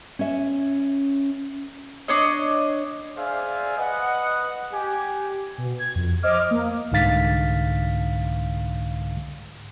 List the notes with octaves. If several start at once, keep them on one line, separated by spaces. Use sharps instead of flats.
C#4 E5
D4 C#5 D#5
G#4 C5 D5 E5 F5 G#5
B4 D#5 F#5
G4 G#5
B2
G#6
F2
C5 D#5 D6 F6
A#3
C2 G#2 D3 F5 A6 B6